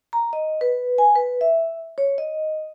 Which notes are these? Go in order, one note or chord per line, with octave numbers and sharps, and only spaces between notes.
A#5
D#5
B4
G#5
B4
E5
C#5
D#5